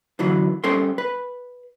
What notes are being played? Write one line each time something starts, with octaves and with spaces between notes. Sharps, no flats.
F#2 D3 E3 F#3
G3 C#4 A4 C5 G5 C6
B4